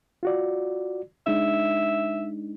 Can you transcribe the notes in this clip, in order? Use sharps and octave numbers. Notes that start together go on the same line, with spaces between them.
F4 F#4 D5
G#3 D4 D#4 E5